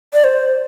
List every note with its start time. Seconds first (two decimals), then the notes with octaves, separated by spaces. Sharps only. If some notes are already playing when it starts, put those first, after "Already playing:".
0.13 D5
0.24 C5